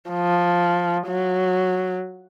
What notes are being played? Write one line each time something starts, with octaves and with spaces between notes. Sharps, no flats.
F3
F#3